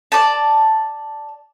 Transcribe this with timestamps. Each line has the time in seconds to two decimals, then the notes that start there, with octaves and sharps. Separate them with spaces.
0.12 D5 A5